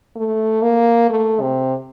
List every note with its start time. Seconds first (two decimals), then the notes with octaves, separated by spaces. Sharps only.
0.16 A3
0.62 A#3
1.10 A3
1.41 C3